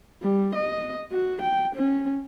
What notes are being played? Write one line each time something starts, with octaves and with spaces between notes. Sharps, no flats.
G3
D#5
F#4
G5
C#4